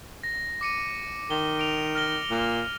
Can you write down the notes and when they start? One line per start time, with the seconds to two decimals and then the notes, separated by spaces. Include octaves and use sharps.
0.23 A#6
0.61 D6 C#7 D#7
1.30 D#3 G7
1.59 D7 F7
1.95 F6 A#6 G7
2.30 A#2